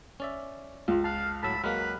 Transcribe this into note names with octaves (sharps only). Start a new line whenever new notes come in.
C#4 D5 E5
C#2 F4
F5 A5 F6 F#6
A2 F#3 A5 B5 E6
F#3 G#3 A#3 B4 B5 F6